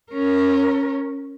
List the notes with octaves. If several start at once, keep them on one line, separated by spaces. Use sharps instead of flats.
C#4 A#4